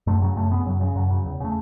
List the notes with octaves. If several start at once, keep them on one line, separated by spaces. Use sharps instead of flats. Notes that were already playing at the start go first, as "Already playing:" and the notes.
F#2 A3
C#3 F#3
F#2 A3
C#3 B3
F#2 F#3
C#3
F#2 F#3
C#3
E2
C#3 A3